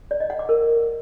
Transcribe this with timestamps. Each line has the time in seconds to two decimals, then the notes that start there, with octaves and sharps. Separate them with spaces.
0.11 D5
0.20 D#5
0.30 F#5
0.39 D6
0.49 A#4